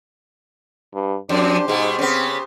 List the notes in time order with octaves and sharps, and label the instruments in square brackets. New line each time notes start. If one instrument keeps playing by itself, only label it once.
[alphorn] G2
[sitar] F2 [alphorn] D4 [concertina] G4 C5
[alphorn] G#2 [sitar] B2 G#3
[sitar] C#3 B3 [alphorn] C4